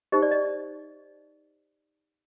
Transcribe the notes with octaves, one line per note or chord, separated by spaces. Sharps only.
D#4 G4 C5 D#5
D5
D#5